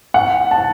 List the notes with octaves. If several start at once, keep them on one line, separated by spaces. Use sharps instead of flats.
F#5
A5